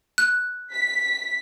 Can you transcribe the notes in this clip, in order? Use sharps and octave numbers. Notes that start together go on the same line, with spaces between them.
F#6
B6